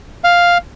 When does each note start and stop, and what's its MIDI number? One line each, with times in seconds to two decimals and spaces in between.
0.24 0.58 77